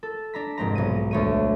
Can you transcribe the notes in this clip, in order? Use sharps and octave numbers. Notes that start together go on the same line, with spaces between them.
A4
D4 A#5 B6
F1 G#2 C4 A#5
B1 D#7
D2 C#5 D#7